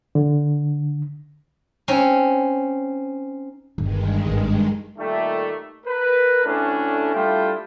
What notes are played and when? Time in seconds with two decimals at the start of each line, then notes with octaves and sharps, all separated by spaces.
0.15 D3
1.88 C4 C#4 D#4
3.78 G1 G2 D#3 G#3
4.26 G#1
4.99 A#2 D#3 G3 A3
5.86 A#4 B4
6.45 D2 A2 A3 C#4 D4
7.14 G3 A3 D4 E4 F4 G5